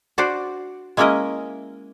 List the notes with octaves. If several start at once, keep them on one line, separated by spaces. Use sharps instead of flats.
D4 F#4 C5 D5
G#3 A#3 C#4 E4 A#4 D#5